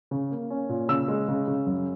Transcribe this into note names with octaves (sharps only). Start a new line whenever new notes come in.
C#3
A#3
C#4
A#2
C#3 E6
G#3
C#3
C#3
F#2